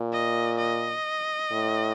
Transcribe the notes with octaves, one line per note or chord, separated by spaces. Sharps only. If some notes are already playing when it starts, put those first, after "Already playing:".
Already playing: A#2
D#5
D#5
A2